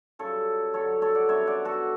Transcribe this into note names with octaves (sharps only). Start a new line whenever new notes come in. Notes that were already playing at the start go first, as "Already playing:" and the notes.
F#2 C#3 G3 A4 C#5
G2 D3 F#3 A4 C#5
A4 C#5
D5 F#5
F#2 D3 G3 B3 C#5 E5
D5 F#5
F#4 A4